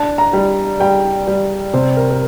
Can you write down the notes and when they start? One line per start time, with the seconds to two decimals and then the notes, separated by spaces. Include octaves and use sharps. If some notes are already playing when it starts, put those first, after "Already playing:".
Already playing: D4 A5
0.18 A#5
0.33 G3
0.80 G3 G5
1.28 G3
1.74 C3 C5
1.97 A#4
2.11 A#4